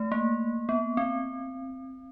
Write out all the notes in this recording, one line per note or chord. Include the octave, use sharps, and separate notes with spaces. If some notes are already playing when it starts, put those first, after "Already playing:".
Already playing: A3
A#3
B3
C4